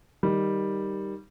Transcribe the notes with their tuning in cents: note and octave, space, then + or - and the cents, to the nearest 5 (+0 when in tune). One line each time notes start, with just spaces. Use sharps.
D#3 +0 G3 +0